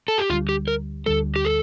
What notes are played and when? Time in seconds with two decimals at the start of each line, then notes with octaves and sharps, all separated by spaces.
0.08 A4
0.18 G4
0.30 D2 D3 G3 F4
0.49 G4
0.68 A#4
1.06 D2 D3 G3 A4
1.36 G4
1.45 A4